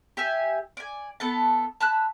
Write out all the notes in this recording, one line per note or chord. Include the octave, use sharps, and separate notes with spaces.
G4 E5 G#5
D5 G#5
B3 A4 A5
A5 B5 E6 F#6